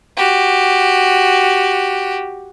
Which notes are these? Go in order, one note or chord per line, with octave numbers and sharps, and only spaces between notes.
F#4 G4